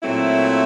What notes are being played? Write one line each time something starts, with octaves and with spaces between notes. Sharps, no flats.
A#2 F#3 A3 C4 E4